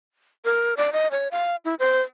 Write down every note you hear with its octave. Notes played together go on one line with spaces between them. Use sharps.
A#4
D5
D#5
C#5
F5
E4
C5